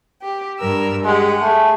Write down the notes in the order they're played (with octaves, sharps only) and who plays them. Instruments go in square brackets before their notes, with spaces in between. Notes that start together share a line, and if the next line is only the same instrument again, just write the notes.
[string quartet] G4
G2 A#4 E6
[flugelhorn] G#3 [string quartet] G4 F#5
[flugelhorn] A3 [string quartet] G#4